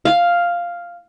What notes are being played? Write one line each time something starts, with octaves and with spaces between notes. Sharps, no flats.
F5